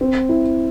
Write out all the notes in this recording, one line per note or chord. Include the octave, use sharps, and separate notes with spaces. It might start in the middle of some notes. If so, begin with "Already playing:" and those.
C4
E4